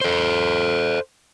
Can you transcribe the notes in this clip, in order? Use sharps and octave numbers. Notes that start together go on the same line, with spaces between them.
A4 C5